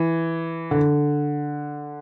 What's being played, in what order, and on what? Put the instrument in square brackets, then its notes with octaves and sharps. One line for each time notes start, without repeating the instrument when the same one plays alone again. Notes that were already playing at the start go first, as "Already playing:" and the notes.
Already playing: [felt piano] E3
D3